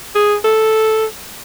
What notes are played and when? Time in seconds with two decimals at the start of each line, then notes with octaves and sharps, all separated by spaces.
0.15 G#4
0.44 A4